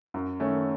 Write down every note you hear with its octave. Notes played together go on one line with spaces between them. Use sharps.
F#2
D#3 A3 C#4